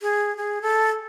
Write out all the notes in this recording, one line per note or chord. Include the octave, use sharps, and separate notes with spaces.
G#4
G#4
A4